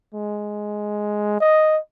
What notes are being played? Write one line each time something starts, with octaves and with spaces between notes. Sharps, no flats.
G#3
D#5